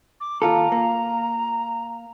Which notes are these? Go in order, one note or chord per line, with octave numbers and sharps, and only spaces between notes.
D6
D#2 F4 A4 A#5
A#3